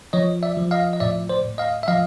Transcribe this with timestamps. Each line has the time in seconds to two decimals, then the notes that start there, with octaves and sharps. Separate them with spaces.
0.13 F3 C#5 D#5
0.43 D5 E5
0.57 F3
0.71 D#5 F5
0.93 D#5
1.00 A2 D5 E5
1.29 C5 D5
1.45 A2
1.58 D#5 F5
1.83 E5
1.88 F3 D#5 F5